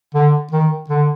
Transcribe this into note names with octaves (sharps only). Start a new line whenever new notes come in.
D3
D#3
D3